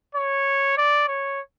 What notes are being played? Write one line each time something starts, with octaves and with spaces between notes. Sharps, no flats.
C#5
D5
C#5